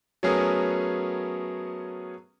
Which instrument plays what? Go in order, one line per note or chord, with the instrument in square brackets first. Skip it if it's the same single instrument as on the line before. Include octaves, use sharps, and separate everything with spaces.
[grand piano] F#3 A3 B3 C#4 G#4 A#4